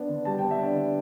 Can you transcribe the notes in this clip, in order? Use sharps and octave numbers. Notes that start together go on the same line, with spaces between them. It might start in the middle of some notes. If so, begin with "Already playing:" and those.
Already playing: B3 D4
D3
G3 A5
B3 G5
E5
D4 D5
D3